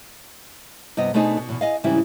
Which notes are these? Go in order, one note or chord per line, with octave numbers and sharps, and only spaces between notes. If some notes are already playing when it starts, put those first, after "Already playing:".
G2 C3 B3 D#5
B2 A3 C4 D4 D#4 G#4
B2
E2 B2
G#4 D#5 F5
G#2 C#3 E3 G3 C4 E4